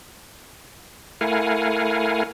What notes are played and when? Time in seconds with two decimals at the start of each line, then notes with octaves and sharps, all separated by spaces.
1.21 A3 E4 A#4 F5 F#5 G#5